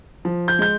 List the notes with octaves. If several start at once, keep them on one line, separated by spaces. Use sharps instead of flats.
F3
G6
G#3 G6